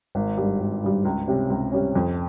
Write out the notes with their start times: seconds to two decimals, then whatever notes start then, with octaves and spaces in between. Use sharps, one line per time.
0.15 G#1
0.37 G2 G3
0.60 G#1
0.83 G2 G3
1.05 C#2
1.28 C3 G3 C#4
1.50 C#2
1.72 C3 G3 C#4
1.95 F2